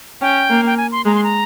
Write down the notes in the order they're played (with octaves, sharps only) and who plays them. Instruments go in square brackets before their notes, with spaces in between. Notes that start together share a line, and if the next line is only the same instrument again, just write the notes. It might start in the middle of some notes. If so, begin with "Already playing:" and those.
[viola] C#4 [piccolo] G5
[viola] A#3
[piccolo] G5
G#5
C6
[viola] G#3 [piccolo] A#5
[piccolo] C6
A#5